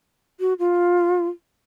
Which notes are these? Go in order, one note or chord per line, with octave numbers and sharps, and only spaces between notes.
F#4
F4